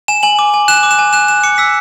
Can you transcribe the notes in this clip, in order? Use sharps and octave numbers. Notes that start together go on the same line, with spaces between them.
G#5 E7
G#5 F#7
D6
G#5
F#6 E7
D6
E7
G#5
F#6 E7
F#6 E7
D6 C#7
E6 B6